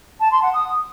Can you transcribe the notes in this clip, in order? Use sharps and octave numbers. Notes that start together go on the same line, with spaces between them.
A5
C6
F#5
D#6